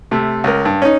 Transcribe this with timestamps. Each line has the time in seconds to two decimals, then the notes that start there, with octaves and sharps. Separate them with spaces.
0.11 C3 A3
0.44 C#2 A#4
0.65 G2
0.82 C#4 D#4